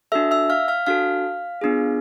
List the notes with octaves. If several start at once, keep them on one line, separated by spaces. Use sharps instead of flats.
D4 F#4 A4 E5 E6
E5 E6
F5 F6
F5 F6
D4 F#4 A4 F5 F6
B3 D4 F4 G#4